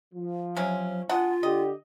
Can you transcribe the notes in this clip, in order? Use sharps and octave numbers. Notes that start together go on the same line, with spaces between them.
F3
C3 F#3 C#4
G#3 D4 F4 F#5
D3 G4 D#5